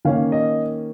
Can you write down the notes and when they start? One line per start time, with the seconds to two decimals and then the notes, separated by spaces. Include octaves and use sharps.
0.05 D#3 A#3 C#4 F5
0.32 D#5